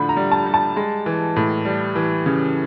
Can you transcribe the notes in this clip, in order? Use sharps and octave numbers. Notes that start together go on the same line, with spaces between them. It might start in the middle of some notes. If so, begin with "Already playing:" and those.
Already playing: A2 D3 F3 B5
A#5
G3
A5
G3
A5
G#3
E3
A2
G3
E3
C#3